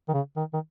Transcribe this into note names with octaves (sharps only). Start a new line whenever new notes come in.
D#3
C#3
D#3
D#3